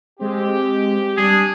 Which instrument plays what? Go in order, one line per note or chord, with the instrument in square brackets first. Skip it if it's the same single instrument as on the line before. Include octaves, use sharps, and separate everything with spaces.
[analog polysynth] G#3 C4 [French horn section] G4
[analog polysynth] G3 [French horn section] D4 [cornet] G#4